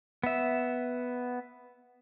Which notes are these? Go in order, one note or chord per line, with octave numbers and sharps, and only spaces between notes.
B3 E5